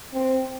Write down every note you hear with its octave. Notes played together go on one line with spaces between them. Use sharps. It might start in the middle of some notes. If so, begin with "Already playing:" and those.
C4